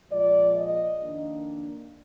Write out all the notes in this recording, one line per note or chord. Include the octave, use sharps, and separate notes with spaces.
A#2 F3 G#3 D5
D#5
F2 D#3 A#3 D4